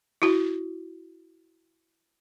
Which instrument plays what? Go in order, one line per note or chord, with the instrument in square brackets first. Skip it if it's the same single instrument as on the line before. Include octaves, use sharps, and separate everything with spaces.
[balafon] E4 F#4